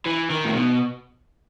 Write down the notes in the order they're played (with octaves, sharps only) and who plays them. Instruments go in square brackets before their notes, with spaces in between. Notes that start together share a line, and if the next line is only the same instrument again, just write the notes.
[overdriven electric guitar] E3
D#3
A2
B2